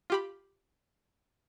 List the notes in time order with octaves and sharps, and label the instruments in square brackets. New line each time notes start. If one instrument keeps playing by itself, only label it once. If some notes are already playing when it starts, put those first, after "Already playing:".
[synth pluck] F4 G4 B5